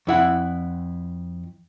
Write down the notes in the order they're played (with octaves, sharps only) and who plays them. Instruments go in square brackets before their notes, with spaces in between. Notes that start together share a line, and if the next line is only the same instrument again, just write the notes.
[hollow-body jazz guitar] F2 E4 F#5